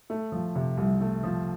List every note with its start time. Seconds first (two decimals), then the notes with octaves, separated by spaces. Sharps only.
0.10 A3
0.32 F3
0.55 C3
0.77 C2
1.01 A3
1.23 F3